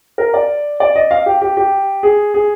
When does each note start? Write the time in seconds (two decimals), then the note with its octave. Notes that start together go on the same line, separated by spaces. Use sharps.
0.18 A#4
0.34 D5
0.80 D5
0.96 D#5
1.11 F5
1.26 G4
1.42 G4
1.57 G4
2.03 G#4
2.34 G#4